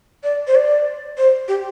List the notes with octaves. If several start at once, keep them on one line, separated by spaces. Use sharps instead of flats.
D5
C5
D5
C5
G4